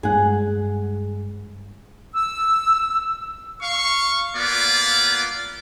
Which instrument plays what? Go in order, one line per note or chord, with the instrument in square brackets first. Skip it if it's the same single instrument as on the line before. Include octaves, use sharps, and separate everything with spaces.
[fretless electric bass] G2 G#3 [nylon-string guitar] G#4 F#5
[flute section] E6
[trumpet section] F5 C#6
A#3 B3 F4 D5